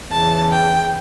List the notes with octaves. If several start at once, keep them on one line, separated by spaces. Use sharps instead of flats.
E2 C#3 E3 A5
G5